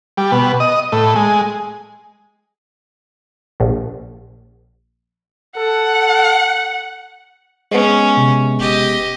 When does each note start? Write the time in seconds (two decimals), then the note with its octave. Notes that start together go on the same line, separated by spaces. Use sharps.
0.17 G3
0.32 B2
0.60 D#5
0.92 A2
1.16 G#3
3.60 A#1
5.57 A4 F#5
7.71 G#3 B3 C#4
8.17 C3
8.59 E1 G4 D#5